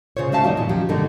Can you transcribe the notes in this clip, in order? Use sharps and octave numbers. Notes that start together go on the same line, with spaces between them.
C#3 F4 C5 C#5
A3 C#4 F#4 E5 F5 A5
D#3 G3 A#3 D#4
G2 A#2 F3
F3 F#3 C#4 G4
G2 B2 D3 A3 A#3 D#4